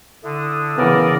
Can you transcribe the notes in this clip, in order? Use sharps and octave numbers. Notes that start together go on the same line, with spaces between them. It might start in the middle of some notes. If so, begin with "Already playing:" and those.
D3 E4 A5 D#6
C#3 E3 B3 A#4 D5